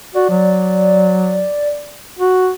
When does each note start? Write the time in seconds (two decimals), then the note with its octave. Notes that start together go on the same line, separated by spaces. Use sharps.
0.15 F#4 D5
0.29 F#3
2.19 F#4